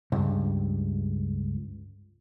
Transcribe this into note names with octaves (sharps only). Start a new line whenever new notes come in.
C#2 G2